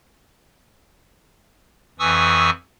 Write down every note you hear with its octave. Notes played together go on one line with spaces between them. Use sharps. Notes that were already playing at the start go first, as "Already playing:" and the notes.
F2 E3 G#5 C#6 D#6 E6